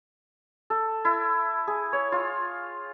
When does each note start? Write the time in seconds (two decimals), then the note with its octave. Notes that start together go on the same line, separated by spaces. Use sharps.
0.70 A4
1.05 E4
1.67 G#4
1.93 C#5
2.12 F4